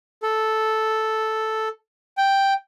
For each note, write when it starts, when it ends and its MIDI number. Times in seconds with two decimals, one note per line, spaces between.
0.23 1.68 69
2.17 2.54 79